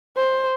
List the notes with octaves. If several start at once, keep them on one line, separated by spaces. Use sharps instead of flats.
C5